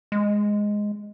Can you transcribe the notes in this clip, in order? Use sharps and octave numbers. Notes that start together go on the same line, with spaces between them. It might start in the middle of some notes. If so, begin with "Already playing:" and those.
G#3